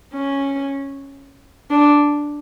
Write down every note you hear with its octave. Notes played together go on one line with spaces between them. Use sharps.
C#4
D4